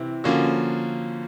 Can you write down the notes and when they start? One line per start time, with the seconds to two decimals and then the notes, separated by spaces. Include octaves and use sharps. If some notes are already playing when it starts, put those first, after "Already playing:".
Already playing: C3 E3 C4 E4
0.24 D3 F3 A#3 C#4 F#4